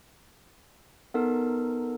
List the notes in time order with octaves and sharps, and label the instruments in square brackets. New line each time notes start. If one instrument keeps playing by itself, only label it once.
[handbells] B3 D#4 A4 A#4